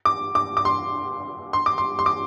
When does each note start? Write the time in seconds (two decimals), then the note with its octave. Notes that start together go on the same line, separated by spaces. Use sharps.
0.05 D6
0.35 D6
0.57 D6
0.65 C6
1.53 C6
1.66 D6
1.78 C6
1.99 C6
2.06 D6